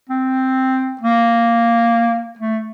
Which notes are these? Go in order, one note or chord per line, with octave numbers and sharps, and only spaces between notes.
C4
A#3
A3